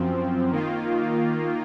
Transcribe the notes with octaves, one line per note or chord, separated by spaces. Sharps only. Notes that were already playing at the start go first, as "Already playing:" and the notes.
Already playing: F#2 F3 C4
D#3 A#3 F4